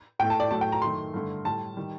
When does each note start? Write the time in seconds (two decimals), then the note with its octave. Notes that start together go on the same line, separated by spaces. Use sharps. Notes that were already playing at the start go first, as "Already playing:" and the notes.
0.19 A2 A3 G5
0.30 A5
0.40 D5
0.51 A2 F#3 A3 A5
0.61 G5
0.72 A#5
0.82 F#2 D#3 A3 C6
1.14 G2 D3 A3
1.45 A2 G3 A5
1.77 D#3 G3